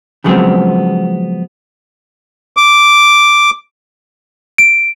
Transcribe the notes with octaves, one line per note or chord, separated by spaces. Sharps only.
C#3 F3 F#3 G#3 B3 C4
D6
D7